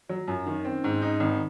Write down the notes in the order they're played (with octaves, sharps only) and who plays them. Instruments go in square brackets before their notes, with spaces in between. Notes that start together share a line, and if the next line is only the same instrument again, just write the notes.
[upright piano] F#3 [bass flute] F#4
[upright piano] F#2 [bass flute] F4
[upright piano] D#3 [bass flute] C#4
[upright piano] C4 [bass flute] C#4
[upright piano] G#2
D#4
[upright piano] G#1 [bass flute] C4